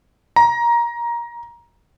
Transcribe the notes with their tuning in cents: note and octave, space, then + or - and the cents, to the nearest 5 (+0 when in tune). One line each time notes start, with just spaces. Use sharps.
A#5 +15